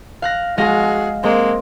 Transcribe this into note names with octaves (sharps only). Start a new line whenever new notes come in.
F5 F#6 A#6
G#3 F#4 G#4 F5 A#6
G#3 A#3 C4